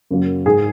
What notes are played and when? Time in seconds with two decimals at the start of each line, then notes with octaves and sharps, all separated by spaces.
0.11 F#2 C#3 F#3 A#3
0.46 G#2 G#3 G#4